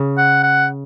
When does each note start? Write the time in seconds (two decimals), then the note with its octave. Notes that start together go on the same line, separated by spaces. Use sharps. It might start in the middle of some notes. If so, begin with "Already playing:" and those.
Already playing: C#3
0.18 F#5
0.43 F#5